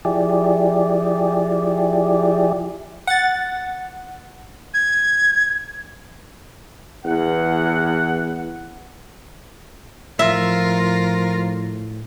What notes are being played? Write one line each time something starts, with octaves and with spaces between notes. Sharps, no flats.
F3 E4 G4 G#4 D5
F#5 A6
G#6
E2 F#5
A2 F3 F4 A#4 E5